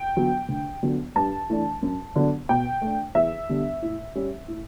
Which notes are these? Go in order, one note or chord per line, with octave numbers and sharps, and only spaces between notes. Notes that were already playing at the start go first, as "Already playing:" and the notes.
Already playing: G5
D3 F#3 B3
D2
D3 F#3 B3
G2 A5
E3 A3 D4
F#2
D3 F#3 B3 D4
B2 G5
A3 D4
E2 E5
D3 G3 B3 D4
A2
G3 C#4
A2